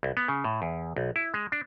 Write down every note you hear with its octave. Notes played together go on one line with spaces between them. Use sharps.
C2
B3
C#3
A2
E2
B1
E4
G#3
D4